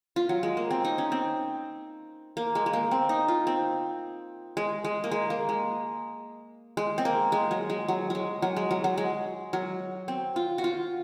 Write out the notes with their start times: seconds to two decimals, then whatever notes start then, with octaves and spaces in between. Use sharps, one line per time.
0.16 F4
0.29 F#3
0.43 G#3
0.57 A#3
0.71 C4
0.84 D#4
0.98 C#4
1.12 C4
2.37 A#3
2.55 G#3
2.66 G#3
2.73 A#3
2.91 C4
3.09 D#4
3.28 F4
3.47 C4
4.57 G#3
4.84 G#3
5.04 A#3
5.11 G#3
5.30 A#3
5.49 G#3
6.77 G#3
6.98 C4
7.05 A#3
7.32 G#3
7.51 F#3
7.70 G#3
7.88 F#3
8.10 F#3 G#3
8.42 F#3
8.56 G#3
8.71 F#3
8.84 F#3
8.98 G#3
9.53 F#3
10.08 C4
10.36 F4
10.58 F#4
10.64 F4